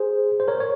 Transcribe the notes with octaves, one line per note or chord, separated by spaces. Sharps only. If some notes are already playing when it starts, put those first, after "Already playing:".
Already playing: G#4 C5
C5
A#4 C#5
C#5